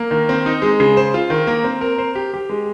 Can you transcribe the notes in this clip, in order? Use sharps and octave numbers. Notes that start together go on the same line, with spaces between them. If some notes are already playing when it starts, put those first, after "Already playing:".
Already playing: A#3
D#3
C4
D#4
G#3
C#3
C5
F4
D#3
A#3
C4
A#4
C5
G4
G4
G#3